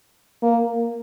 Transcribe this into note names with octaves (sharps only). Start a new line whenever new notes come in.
A#3